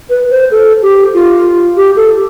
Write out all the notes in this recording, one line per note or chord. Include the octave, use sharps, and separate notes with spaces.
B4
C5
A4
G4
F4
G4
A4